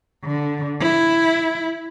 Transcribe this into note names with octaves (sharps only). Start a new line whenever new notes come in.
D3
E4